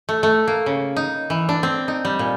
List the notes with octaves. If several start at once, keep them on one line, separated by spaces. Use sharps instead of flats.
A3
A3
A#3
C#3
D#4
E3
D4
C4
D#4
G3
A#2